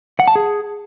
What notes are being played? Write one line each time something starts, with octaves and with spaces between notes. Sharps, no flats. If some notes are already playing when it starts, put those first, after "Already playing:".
F#5
A5
G#4